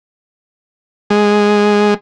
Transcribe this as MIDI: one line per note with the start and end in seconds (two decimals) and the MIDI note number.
1.10 1.94 56